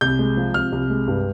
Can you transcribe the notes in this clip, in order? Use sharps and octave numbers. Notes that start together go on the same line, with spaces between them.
C2 G6
G#3
F3
C3 F6
C2
G#3
G2